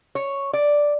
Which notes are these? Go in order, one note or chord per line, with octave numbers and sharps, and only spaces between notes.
C#5
D5